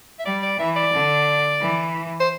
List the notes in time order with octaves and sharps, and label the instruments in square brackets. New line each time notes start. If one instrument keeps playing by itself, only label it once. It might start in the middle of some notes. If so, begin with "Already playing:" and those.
[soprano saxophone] E5
[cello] G3 [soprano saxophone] D5
[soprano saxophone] D5
[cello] E3 [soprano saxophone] E5
[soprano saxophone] D5
[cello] D3
E3
[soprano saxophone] C5